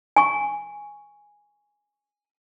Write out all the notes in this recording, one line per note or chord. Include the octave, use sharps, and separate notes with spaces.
G#5 C#6